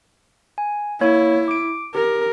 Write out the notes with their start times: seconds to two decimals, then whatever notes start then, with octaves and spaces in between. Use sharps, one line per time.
0.58 G#5
1.01 A#3 E4 C#5
1.48 D6 D7
1.95 G4 A#4